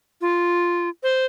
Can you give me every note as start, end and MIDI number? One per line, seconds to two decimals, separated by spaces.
0.21 0.89 65
1.03 1.26 72